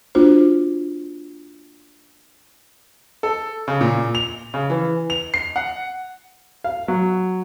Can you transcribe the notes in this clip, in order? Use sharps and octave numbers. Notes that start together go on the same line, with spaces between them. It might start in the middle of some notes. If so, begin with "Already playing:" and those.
A#3 D4 F4 F#4 C5
A4
C#3
A#2
F7
C#3
E3
F7
C7
F#5
F5
F#3